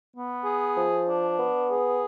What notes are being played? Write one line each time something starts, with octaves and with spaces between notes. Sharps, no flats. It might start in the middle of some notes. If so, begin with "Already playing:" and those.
B3
G#4
F3
D4
B3
G#4